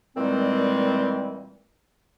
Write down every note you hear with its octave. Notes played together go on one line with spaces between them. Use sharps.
A#2 D#3 E3 G3 G#3 C4